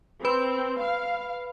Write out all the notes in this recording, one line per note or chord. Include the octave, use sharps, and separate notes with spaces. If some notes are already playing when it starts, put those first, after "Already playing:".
C4 B4 B5
F5